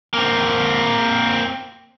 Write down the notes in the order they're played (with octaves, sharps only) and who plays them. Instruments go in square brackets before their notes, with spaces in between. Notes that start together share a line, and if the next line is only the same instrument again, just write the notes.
[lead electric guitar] A#3 C4